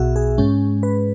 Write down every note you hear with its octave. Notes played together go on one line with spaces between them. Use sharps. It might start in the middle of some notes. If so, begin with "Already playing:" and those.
Already playing: B1 B2 B3 F#4 G#4 E5
G#4
G#2 G#3 C#4
B4